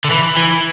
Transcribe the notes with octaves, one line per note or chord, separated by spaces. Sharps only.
D3
E3
E3